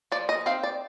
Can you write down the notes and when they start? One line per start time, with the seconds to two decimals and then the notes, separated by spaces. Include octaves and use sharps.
0.12 F3 D5
0.29 D#5
0.46 C4 D#4 F5
0.63 D5